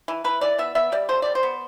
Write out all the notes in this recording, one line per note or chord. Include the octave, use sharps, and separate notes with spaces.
E3
E3 B4
E3 D5
B3 E5
B3 E5
G3 D5
D3 C5
G3 D5
C5
B3